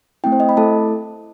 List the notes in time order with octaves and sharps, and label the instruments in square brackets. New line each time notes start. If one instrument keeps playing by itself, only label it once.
[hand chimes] A3 C4 E4 G5
C5
D#5
B5
A3 E4 A4 A5